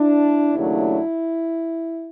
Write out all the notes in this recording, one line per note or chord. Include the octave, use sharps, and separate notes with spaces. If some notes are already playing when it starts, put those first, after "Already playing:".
Already playing: D4 E4
D#2 C#3 F#3 A3 D4